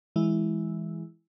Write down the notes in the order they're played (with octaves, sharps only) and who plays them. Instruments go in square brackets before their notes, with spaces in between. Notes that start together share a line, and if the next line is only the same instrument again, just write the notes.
[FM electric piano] E3 G#3 E4